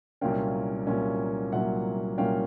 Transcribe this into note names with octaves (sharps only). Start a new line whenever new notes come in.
C2 A#2 F#3 A#3 C#4 F5 G5
C2 A#2 F#3 A#3 C#4
C2 A#2 F#3 A#3 C#4 E5 F#5
C2 A#2 F#3 A#3 C#4 F5 G5